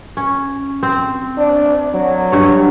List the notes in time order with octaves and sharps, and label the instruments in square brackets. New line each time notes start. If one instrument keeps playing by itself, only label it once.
[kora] C#4
C4
[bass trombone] D4
F#3
[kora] G2 C#5